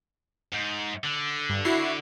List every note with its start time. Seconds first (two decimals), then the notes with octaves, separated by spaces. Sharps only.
0.52 G#2
1.04 D3
1.49 G2
1.65 E4 F#4 C7